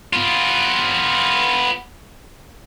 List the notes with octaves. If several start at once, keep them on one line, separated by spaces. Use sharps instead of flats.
B3 F4